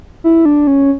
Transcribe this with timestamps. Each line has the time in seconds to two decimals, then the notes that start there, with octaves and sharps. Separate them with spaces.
0.24 E4
0.45 D4
0.67 C#4